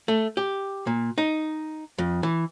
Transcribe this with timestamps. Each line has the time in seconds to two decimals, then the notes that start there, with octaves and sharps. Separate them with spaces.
0.08 A3
0.37 G4
0.87 A#2
1.18 D#4
1.98 F2
2.23 E3